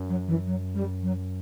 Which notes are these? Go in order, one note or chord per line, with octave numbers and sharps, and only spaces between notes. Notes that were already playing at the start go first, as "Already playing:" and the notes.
Already playing: F#2
F#3
E3
F#3
G3
F#3